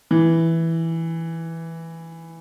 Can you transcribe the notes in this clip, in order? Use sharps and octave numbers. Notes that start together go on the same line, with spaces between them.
E3